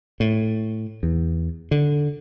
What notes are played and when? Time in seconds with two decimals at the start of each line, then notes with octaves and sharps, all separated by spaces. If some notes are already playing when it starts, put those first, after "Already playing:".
0.20 A2
1.03 E2
1.71 D3